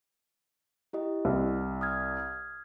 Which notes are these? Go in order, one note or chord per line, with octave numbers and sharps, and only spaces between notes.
E4 G4 D#5
C2
D#6 F6 G#6